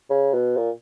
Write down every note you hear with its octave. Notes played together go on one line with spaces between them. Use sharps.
C#3
B2
A#2